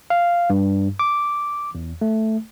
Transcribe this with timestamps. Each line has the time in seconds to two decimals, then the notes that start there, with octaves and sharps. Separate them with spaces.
0.10 F5
0.50 G2
0.99 D6
1.75 E2
2.01 A3